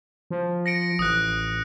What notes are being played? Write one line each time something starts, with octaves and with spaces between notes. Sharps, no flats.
F3
A#6 C#7 D7
A1 D#6 F#6